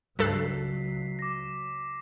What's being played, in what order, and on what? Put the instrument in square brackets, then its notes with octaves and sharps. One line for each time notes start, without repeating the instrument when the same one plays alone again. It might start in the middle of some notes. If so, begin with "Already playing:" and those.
[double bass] C#2 F#3 [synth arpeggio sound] G2 A4 F#6 [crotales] B6 C7
[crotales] D6 A#6